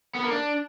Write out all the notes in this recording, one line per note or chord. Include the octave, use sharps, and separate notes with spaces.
B3
A#3
D4